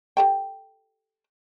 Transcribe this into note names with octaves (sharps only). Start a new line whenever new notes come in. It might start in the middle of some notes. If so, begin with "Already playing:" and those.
G4 A4 G5